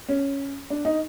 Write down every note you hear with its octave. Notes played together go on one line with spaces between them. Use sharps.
C#4
D4
D#4